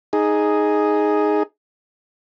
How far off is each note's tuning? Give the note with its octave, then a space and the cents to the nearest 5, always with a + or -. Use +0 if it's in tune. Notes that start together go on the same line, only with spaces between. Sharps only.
D#4 +0 G#4 +0